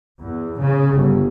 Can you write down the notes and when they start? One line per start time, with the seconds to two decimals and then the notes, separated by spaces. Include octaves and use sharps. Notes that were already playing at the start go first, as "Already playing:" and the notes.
0.22 E2
0.61 C#3
0.95 G1